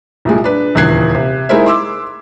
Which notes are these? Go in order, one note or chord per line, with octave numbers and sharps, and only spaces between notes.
C2 A#2 G#3
D4 B4
D#1 E2 C#3 F#6 G#6 C7
C3
G#3 D#4 E4 A#4 C5 E5
C6 D6 E6